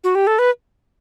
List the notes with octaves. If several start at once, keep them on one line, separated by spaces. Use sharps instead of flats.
F#4
G4
A4
B4